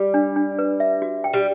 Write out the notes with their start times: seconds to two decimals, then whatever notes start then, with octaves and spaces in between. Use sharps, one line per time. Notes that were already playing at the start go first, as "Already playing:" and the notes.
Already playing: G3
0.14 D4
0.36 D4
0.59 B4
0.80 E5
1.02 F#4
1.24 G5
1.34 G3